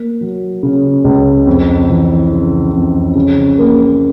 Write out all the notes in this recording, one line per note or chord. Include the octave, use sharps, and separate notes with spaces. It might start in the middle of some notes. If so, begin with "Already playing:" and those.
Already playing: A#3
F#3
C#3
C#2
F2
E3
C#3
F2
C#3
A#3